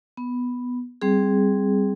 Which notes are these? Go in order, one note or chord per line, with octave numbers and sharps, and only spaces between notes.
B3
G3 C4 G#4